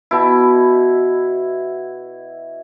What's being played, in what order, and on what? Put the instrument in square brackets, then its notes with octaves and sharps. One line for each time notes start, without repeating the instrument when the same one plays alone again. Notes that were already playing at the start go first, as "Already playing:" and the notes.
[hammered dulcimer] B2 E4